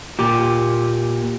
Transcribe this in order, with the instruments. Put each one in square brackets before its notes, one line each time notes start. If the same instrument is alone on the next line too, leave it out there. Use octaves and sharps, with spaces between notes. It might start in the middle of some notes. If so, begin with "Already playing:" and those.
[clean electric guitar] A#2 [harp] G4